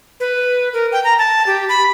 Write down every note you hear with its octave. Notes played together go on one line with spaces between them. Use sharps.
B4
A#4
G5
A#5
A5
G4
B5